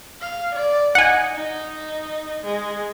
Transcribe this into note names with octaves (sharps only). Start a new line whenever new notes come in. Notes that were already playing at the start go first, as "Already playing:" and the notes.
F5
D5
D#4 F#5 G#5
D#4
G#3